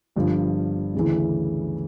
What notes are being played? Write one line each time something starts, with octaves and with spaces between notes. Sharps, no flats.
G1 G2 F3
D2 C#3 E3